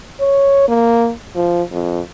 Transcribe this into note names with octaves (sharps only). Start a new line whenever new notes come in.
C#5
A#3
F3
F2